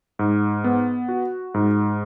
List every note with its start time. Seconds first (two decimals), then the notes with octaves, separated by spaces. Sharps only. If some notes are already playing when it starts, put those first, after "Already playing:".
0.19 G#2
0.64 B3
1.09 F#4
1.54 G#2